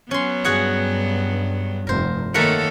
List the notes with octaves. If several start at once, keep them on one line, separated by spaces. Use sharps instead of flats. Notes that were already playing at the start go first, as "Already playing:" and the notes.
F#3 B3 C#4 C6
G2 F#4 G#4 F#5
F1 G2 A#4 C5
D#3 A3 A#3 A4 A#4 C#5 F#5